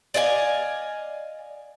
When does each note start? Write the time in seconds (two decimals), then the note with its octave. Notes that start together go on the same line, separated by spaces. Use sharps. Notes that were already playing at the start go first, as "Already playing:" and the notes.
0.14 D5 D#5 F5 G#5